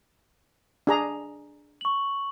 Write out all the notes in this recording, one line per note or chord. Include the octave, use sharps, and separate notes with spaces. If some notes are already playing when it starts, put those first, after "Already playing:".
D4 G#4 A#5
C#6 F#7